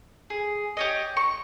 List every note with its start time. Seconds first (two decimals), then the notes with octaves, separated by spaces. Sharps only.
0.30 G#4
0.77 G4 C#5 D#5
1.17 C#6